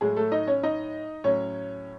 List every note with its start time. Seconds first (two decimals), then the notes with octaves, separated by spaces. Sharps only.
0.01 A2 F#3 G#3 G#4
0.16 A3 A4
0.32 D#4 D#5
0.47 C#4 C#5
0.63 D#4 D#5
1.24 A2 F#3 C#4 C#5